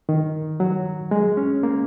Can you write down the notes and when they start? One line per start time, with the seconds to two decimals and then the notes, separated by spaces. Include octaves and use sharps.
0.09 D#3
0.60 F#3
1.11 G#3
1.37 C#4
1.63 A#3